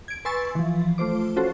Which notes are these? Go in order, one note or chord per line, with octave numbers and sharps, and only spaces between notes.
G#6 D7
B4 G#5 C6 C#6 E6 A6
E3 F3
A3 F4 C5 D6
C#4 F4 F#4 A4 C5